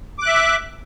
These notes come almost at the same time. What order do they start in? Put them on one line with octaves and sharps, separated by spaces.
D6 F#6 E5